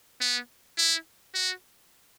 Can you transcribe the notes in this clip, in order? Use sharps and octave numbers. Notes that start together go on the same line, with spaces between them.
B3
E4
F#4